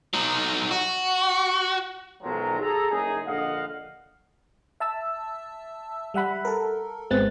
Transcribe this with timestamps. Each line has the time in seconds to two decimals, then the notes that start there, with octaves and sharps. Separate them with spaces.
0.14 F#3 D#4
0.71 F#4
2.23 B1 D#3 F3 F#3 G#3 A#5
2.60 G#4 A4 A#5
2.90 F#1 F#2 D#4 G#4
3.27 A#1 D3 D#5 F5 F#5
4.80 E5 A5 E6
6.14 G3 E5 F#5 B5
6.45 A4 A#4
7.10 G#1 G#3 B3 C4 F#6 A6